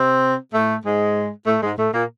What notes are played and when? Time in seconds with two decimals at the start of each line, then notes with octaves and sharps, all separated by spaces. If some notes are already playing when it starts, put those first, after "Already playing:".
Already playing: C3 C4
0.53 A2 A3
0.85 G#2 G#3
1.46 A2 A3
1.62 G#2 G#3
1.77 A2 A3
1.93 A#2 A#3